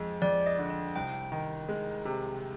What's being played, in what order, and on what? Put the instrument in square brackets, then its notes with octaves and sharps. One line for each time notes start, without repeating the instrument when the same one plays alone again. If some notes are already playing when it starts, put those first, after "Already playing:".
Already playing: [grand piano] F2 G#3
[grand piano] F2 [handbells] D5
[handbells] D#5
[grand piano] D3
[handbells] D#5
[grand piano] C2 [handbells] G5
[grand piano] D#3
G#3
C3